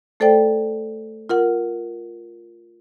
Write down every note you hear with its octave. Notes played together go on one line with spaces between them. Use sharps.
A3 A4 C5 D5 G5
F4 A#4 F#5